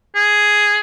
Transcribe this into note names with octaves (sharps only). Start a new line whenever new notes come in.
G#4